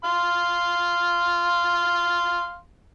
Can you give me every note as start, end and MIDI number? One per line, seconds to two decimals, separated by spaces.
0.04 2.58 77
0.04 2.58 84